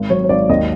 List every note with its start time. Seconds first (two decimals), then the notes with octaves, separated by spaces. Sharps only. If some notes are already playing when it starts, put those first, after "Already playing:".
Already playing: G#1
0.10 F#3 C#5
0.24 C#5
0.29 G#1 D5
0.49 D#2 D#5